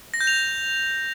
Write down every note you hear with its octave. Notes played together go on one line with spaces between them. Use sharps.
A#6
G6
F7